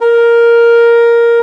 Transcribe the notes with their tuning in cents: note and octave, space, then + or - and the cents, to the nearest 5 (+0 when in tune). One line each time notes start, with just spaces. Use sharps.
A#4 +5